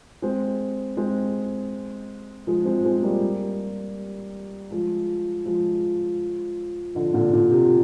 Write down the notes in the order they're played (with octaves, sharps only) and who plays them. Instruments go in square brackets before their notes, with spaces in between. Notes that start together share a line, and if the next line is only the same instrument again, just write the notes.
[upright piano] G#3 C4
G#3 C4
F3 G#3
G#3 C4
G#3 C4
G3 A#3
F3 G#3
F3 G#3
D3 F3
A#2 D3
A#2
C3